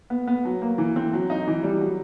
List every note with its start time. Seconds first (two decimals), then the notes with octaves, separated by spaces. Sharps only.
0.10 B3
0.28 B3
0.45 F#3
0.62 A#3
0.78 E3
0.96 C4
1.13 F#3
1.30 D#4
1.47 E3
1.63 G3
1.81 F#3